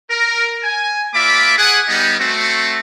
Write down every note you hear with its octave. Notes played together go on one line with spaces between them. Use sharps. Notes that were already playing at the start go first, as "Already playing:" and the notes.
A#4
G#5
A#3 F4 D5 E5 B5 D6
G#4 F#5 G#5
G3 B3 D#4
A3 C4 F#4